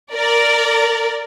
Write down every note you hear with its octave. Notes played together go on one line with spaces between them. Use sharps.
A#4 D5